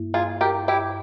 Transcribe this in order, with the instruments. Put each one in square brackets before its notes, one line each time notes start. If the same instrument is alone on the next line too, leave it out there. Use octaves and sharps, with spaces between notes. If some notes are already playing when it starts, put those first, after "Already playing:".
Already playing: [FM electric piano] G2 A#3 E4
[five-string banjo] F4 G#4
G4 A#4
E4 G4